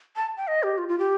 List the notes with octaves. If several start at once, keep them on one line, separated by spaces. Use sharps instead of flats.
A5
G5
D#5
G4
F4
F4
G4